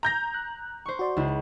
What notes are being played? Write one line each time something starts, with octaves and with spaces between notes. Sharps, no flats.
A#5 G6 A#6
F#6
C5 C#6
F#4 D5 C6
C#2 E4